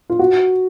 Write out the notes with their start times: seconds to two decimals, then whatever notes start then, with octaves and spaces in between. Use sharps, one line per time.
0.10 F4
0.19 F#4